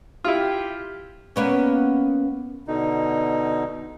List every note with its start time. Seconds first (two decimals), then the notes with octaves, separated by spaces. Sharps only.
0.24 E4 F4 G4
1.36 A#3 B3 C#4
2.68 B2 D3 D#4